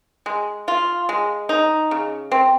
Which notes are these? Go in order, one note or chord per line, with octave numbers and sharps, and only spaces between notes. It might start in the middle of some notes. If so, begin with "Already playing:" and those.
G#3
F4
G#3
D#4
C#3
C4